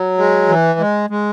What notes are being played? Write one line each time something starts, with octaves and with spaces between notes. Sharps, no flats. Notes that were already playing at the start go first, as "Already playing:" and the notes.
Already playing: F#3
G#3
E3
G#3
G#3